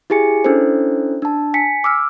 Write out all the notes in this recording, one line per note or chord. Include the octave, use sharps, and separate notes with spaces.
E4 G4 G#4 G#5 C#7
C#4 D4 E4 A4 C5
D4 A5
G#5 B6 C#7
D6 E6 F6